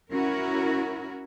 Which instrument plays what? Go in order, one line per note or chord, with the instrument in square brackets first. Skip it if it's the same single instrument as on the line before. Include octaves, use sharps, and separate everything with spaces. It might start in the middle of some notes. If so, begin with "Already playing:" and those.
[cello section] C#4 E4 F#4 A#4